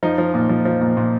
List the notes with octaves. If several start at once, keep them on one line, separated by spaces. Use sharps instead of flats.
F3 D#4
F3
A#2
F3
F3
A#2
A#2